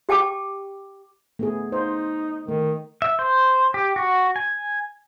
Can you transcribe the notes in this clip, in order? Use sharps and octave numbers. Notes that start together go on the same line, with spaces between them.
G4 G5 A5 D6
A3 B3 G#4
D#4 C5
D#3 A3
E5
C5
G4
F#4
G#5